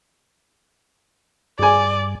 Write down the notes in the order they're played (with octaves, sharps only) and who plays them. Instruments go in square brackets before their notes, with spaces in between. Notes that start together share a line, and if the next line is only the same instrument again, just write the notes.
[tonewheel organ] G2 [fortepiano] G#4 G#5 [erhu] D5